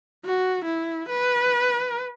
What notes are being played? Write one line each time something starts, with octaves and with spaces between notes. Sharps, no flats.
F#4
E4
B4